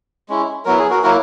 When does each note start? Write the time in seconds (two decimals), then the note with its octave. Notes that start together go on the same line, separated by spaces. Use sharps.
0.29 G#3 C#4 E4
0.65 F#3 B3 E4 F#4 A#4
0.79 G#4
0.90 F#4 A#4
1.03 F#3 A#3 E4 F#4 A#4